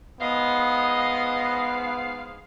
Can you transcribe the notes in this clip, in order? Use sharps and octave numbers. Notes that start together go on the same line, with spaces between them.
G#2 B3 G#4 D#5 F5